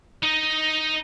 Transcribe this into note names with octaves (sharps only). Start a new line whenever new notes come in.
D#4 D#5